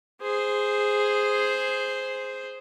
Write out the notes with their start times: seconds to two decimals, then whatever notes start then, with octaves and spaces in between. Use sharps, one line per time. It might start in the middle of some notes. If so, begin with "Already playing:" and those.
0.21 G#4 C5